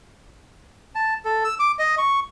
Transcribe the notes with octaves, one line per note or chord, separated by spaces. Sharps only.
A5
A4
E6
D6
D#5
C#6